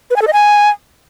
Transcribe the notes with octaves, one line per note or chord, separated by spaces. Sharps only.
B4
G#5
A4
D#5
G#5